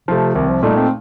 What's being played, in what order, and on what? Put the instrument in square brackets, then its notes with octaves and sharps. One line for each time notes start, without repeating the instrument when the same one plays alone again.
[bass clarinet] C3 [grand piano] F3 A3
[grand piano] C2 [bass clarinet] D#3
[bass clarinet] F3
[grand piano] A#2 A3 D#4 [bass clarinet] G3
[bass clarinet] C4